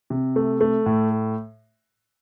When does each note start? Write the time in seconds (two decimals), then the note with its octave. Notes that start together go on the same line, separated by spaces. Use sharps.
0.10 C3
0.36 A3
0.61 A3
0.86 A2